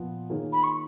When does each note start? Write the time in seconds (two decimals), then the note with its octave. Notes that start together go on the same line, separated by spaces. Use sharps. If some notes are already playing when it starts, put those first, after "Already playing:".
Already playing: A#2 F3 B3 F4
0.30 D#3 A#3 F4 G#4 C#5
0.53 B5
0.64 C#6